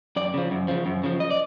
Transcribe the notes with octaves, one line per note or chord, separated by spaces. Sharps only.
F#2 D5
C#3 F3
F#2
C#3 F3
F#2
C#3 F3
D#5
D5